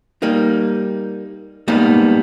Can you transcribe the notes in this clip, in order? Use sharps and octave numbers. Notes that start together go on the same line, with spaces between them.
G3 A#3 D#4
G3 G#3 A#3 B3 D#4 D#5